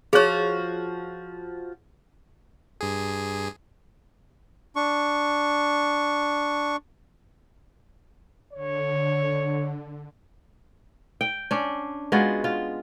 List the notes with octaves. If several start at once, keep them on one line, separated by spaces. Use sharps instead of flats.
F3 F#4 G#4 C#5
G2 G#4
D4 C#6
D3 C#5
G5
C#4 D4
G#3 B3 F4 F#4
F4